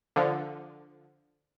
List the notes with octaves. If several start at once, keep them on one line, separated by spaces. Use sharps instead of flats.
D3 F3